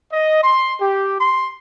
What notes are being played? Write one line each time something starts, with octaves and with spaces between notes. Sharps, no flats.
D#5
C6
G4
C6